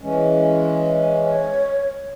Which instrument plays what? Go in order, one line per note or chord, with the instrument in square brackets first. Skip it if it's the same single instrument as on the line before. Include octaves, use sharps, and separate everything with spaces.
[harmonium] E3 G#3 C#4
[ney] C#5